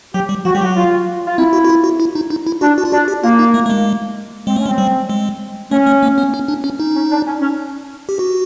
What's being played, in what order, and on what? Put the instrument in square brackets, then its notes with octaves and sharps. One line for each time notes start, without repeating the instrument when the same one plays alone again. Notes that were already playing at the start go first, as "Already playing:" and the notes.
[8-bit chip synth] F#3 [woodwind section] G4
[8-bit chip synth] G3
[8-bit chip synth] F3 [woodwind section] F#4
[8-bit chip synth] G3 [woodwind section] G4
[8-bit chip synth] F#3 [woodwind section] F#4
[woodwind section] F4
F4
[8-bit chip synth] C4 [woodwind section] E4
[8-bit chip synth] F#4
F#4
F4
F#4
E4
D#4
D#4
E4
[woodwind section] D4 [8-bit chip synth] F#4
[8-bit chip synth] F#4
F4
[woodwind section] D4 [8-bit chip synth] F#4
[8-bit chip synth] G4
[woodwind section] A#3 [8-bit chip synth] F4
[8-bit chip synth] D#4
A3
A3
G#3
[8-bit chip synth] G#3 [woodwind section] C4
[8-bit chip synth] A3 [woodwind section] C#4
[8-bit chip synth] G#3
[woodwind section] C4
[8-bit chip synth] G3
G#3
[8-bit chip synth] A3 [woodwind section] C#4
[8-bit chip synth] A3
A#3
B3
C#4
D4
C#4
D#4
[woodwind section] C#4
D4
C#4
C#4
[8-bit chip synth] G4
F#4